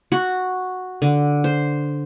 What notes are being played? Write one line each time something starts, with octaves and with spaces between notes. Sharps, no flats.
F#4
D3
C5